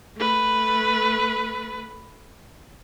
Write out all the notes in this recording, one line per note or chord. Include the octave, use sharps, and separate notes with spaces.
A3 B4